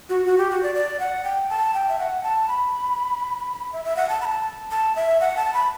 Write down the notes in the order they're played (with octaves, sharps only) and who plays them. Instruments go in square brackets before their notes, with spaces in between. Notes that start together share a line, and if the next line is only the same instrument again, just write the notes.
[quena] F#4
F#4
G4
F#4
D5
D5
F#5
G5
A5
G5
E5
F#5
A5
B5
E5
E5
F#5
A5
B5
A5
A5
E5
F#5
A5
B5